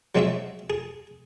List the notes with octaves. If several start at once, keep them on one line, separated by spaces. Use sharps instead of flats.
F#3 G#3 C4 C#4 G#4 E5
G#4